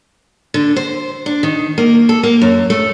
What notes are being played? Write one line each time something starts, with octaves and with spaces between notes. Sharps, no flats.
D3
C5
D4
D#3
A#3
A4
A#3
F#2
A3